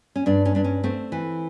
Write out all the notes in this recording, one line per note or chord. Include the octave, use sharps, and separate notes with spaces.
C#4
G2 D4
C#4
G2 D4
C#4
A3 C4
E3